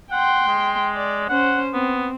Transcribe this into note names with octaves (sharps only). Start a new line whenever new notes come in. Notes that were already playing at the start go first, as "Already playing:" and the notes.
F#5 G5 C6
G#3
D5
C#4 C5 F#5
B3 C4